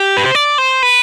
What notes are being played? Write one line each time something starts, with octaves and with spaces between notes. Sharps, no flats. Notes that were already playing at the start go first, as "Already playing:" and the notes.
Already playing: G4
B4
C5
D5
C5
B4